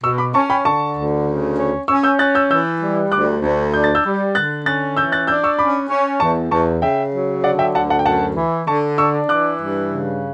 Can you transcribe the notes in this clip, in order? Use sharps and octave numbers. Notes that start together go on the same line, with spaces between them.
B2 C#6 E6
B5 D6
C#4 A5 C#6
G5 B5
D3 A5 C#6
D2
C#3
C#4
C#4 C#6 E6
E6 G6
C#4 F#6 A6
E6 G6
E3 E6 G6
G3
D2 D6 F#6
D2
D4 G6
A6
E6 G6
G3
D3 F#6 A6
C#4 F#6 A6
E3 E6 G6
F#6 A6
D4 E6 G6
C#6 E6
C#4 B5 D6
C#4
E2 A5 C#6
E2 A5 C#6
C#3 E5 G5
F#3
D3 D5 F#5
E5 G5
D2 F#5 A5
F#5 A5
G5
F#2 F#5 A5
E3
D3 A5 C#6
D4 C#6 E6
E3 D6 F#6
G2
C#3